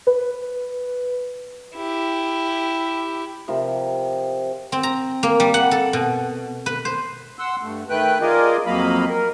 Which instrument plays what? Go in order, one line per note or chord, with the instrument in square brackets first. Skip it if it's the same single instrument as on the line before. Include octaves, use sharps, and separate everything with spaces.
[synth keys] B4
[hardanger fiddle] E4 G4
[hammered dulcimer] C3 F3 C4 A#4
[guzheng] C4
A#5
A#3
G3
F#5
A4
B2
B4
C5
[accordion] F#5 C6 E6
G2 A3
D#3 A3 B4 G5 F#6
F4 G#4 A#4 D5 D#5
F2 F#3 A#3 D#5 F5 B5
A#4